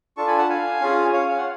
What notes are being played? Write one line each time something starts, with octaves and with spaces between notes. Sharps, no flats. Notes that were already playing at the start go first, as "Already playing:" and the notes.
D4 F4 A4 A5 C#6
G#5 B5
F#5 A5
F5 G#5
C#4 F4 G#4
C#5 F5
F5
F#5